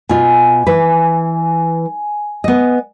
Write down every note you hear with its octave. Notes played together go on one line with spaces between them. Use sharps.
B2 F4 G#5
E3 B4
B3 D#5